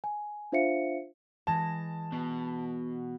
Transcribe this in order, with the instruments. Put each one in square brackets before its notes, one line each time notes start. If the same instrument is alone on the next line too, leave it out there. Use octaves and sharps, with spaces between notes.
[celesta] G#5
D4 F4 C5 E5 F5 C#7
[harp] E3 G#3 A#6 [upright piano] A5
[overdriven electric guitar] B2